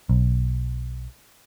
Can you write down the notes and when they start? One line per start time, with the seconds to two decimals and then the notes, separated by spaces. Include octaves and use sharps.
0.09 B1